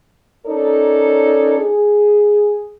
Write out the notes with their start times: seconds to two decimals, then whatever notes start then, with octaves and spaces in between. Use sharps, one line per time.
0.47 C#4 D#4 A4 A#4 C#5 D5
1.59 G#4